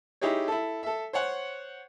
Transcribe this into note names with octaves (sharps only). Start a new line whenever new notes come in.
D#4 E4 G4 G#4 C#5
E4 A4
A4 E5
C5 C#5 F#5